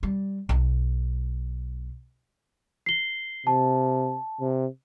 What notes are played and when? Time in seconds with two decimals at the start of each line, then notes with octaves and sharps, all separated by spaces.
0.03 G3
0.49 B1
2.86 C7 G7
3.47 C3 A5
4.41 C3